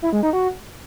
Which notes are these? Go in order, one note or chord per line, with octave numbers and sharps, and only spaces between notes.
E4
G#3
D#4
F#4